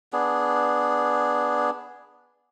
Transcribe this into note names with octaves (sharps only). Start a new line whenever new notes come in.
B3 D4 G#4